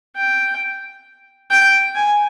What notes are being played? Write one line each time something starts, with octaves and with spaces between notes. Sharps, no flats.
G5
G5
G#5